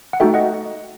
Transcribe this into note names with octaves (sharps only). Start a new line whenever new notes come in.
F#5
A3 D#4 F#4 A4 E5 G5
D#5 F#5